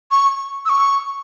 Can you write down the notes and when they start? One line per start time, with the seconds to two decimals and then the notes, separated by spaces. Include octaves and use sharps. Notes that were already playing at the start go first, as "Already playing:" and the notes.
0.11 C#6
0.65 E6
0.69 C#6